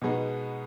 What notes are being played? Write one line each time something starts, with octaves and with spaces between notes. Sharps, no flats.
B2 G#3 B3 D#4